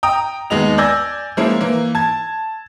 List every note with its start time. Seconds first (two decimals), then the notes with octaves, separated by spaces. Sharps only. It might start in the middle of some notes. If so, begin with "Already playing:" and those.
0.03 G5 A#5 D#6
0.50 D#2 G#3 B3 D#5 F7
0.78 D5 G#5 E6 G6 G#6 A#6
1.37 F3 G#3 A#3 C#4 E4
1.61 E3 A#3
1.95 A5 G#6